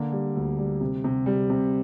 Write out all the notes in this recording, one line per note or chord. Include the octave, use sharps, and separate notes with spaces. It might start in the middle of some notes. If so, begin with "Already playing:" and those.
Already playing: D3 A#3
G3
D2
G3
C3
C3
G3
C3